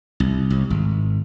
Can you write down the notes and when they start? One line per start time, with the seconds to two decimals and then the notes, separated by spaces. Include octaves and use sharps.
0.20 C2
0.50 C2
0.70 G#1